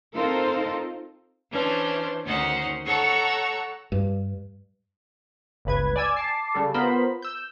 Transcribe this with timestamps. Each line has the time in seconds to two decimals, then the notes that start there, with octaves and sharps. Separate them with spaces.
0.15 C4 D#4 F4 A4 A#4 C5
1.51 E3 C#4 D4 C5
2.24 D2 D#3 C#4 D#4 C5 F#5
2.85 A4 C#5 F#5 A#5 C#6 E6
3.92 G2
5.65 G1 C#2 B4 G#6
5.96 D5 G#5 E6 G#6
6.17 A5 D6 C7
6.55 C#3 G3 A4
6.74 B3 F4 A#4 C5 B5
7.22 E6 G6